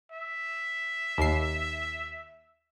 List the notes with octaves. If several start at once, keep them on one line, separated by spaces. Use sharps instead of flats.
E5
D#2 C7